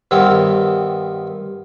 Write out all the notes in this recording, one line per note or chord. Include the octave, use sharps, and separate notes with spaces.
G2 D#3 B3 C4